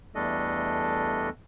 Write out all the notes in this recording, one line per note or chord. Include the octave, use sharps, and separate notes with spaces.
E2 G3 A3 D4 A4 D#5